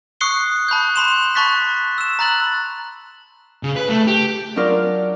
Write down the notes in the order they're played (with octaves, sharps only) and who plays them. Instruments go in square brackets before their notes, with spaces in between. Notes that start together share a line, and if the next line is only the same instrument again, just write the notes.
[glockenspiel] C#6 D#6 F#6 C7 C#7 G7
A5 B5 F#6 G6
B5 C6 E7
A5 B5 C#6 F#6 A6 B6
E6 E7
A#5 B5 F#6 A6 F#7
[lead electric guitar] C#3
B4
A3
G4
[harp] F#3 D4 F4 A#4 D5 F6